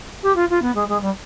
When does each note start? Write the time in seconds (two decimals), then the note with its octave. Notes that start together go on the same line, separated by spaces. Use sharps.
0.23 G4
0.36 F4
0.50 F4
0.62 B3
0.75 G#3
0.89 G#3
1.02 G3